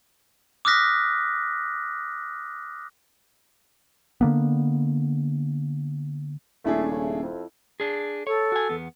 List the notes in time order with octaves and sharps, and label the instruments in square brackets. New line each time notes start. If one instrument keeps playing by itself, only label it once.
[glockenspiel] D6 D#6 F6 F#6 A#6 B6
[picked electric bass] D3 A#3 B3
[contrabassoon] D#1 [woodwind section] A3 [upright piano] C#4 D4 G#4 [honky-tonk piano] E4
[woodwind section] C#3 A3
F2
[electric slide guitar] D4 G#4
[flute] A4 [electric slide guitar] C#5
[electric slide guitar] F#4 G#5
E2 B3